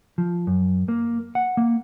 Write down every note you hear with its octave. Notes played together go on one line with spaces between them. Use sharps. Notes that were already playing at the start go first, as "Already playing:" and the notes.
F3
F#2
A#3
F#5
A#3